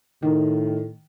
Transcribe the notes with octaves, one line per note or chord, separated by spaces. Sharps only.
A2 D#3